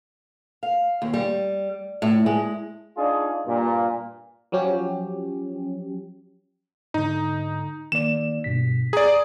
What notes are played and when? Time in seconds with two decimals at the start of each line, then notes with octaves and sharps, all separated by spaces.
0.63 F5
1.02 D#2
1.14 G3
2.02 A2
2.26 G#3
2.96 D4 D#4 F4 G#4
3.47 G2 A#2
4.52 F3 F#3 C#4 G4
6.94 G#2 D3 D#4
7.92 D#3 A#3 D5 E7
8.44 G2 B2 B6
8.93 G#4 D5 A#5 D6